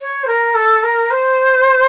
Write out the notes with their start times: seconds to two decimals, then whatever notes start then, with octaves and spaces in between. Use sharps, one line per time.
0.01 C#5
0.23 C5
0.27 A#4
0.55 A4
0.83 A#4
1.11 C5